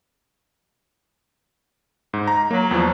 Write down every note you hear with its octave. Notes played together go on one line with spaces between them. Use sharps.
G#2
A#5
F#3 A#3
E2 F3